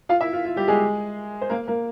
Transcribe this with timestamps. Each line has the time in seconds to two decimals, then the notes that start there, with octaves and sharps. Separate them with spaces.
0.09 F4 F5
0.21 E4 E5
0.33 F4
0.45 F4
0.56 G3 G4
0.68 G#3 G#4
1.41 C5
1.50 A#3 A#4
1.68 A#3 A#4